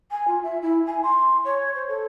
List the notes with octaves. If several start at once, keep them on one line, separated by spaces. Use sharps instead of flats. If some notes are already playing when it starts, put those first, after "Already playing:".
G#5
F4
E5
E4
G#5
C6
C#5
C5
A4